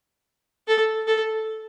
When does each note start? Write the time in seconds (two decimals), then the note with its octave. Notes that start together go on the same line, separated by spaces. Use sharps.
0.68 A4
1.07 A4